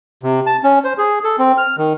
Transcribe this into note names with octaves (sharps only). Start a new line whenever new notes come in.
C3
A5
C#4
C5
G#4
A4
C4
F6
D#3